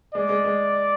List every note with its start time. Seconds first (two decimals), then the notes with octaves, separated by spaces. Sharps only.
0.14 G#3 D5
0.29 G#3
0.44 G#3